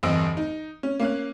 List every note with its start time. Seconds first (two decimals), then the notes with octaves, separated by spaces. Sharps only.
0.03 G1 E2 C4 D#5 E6 D7
0.37 D#4
0.83 C#4
1.00 A#3 C#4 F5 F#6